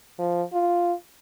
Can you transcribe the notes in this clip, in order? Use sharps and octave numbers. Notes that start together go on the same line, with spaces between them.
F3
F4